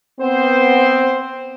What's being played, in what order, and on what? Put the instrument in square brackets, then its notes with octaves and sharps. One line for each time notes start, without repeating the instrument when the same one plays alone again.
[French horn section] B3 C4 C5